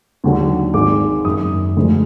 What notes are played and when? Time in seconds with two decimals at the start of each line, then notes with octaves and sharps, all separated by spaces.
0.24 D#2 D3 F#3
0.74 G#1 G#2 D#3 G#3 D6
1.25 F#1 F#2 D#3 D#6
1.77 D2 D3 F3 G#3